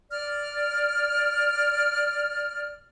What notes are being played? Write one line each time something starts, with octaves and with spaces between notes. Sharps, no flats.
D5 F6